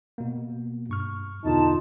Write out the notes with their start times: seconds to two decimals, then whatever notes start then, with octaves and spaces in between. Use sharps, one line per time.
0.18 B2 A#3
0.89 G2 C#6 F6
1.45 E2 B2 D3 D#4 F4 A5